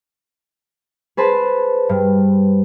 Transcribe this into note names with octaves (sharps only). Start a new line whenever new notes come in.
G#4 B4 C5 A5
G2